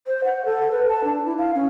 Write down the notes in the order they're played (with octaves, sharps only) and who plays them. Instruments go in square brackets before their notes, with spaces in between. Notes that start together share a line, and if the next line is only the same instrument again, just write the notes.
[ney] C5
F#5
A4
B4
A5
D4
E4
F5
C#4